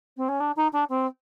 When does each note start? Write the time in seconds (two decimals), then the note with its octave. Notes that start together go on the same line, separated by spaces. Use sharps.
0.17 C4
0.28 C#4
0.40 D4
0.56 D#4
0.72 D4
0.89 C4